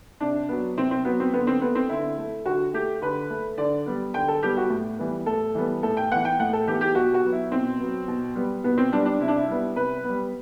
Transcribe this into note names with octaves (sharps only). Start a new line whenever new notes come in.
C3 D4
F#3 B3
C3 C4
C4
F#3 B3
C4
D3 B3
C4
A3 B3
C4
D3 E4
A3
D3 F#4
A3 G4
D3 B4
A3
D3 D5
G3 B3
D3 G5
A4
G3 B3 G4
F#4
A2
E3 G3 B3
A2 A4
E3 G3 B3
A2 A4
G5
E3 B3 F#5
G5
A2 F#5
A4
E3 B3 G4
G4
B2 F#4
F#4
F#3 B3
E4
B2 C4
F#3 B3
B2
G3 B3
B2 B3
C4
G3 B3 D4
D4
C3 E4
D4
E4
G3 B3
C3 B4
G3 B3